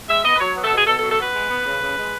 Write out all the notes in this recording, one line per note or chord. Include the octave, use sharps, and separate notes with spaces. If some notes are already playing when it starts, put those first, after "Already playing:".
G#3 E5
B3 D#5
B4
F#3 C#5
B3
A4
B2 G#4
B2 A4
A4
F#3
A4
B3 B4
G#3
B3
C#3
C#3
G#3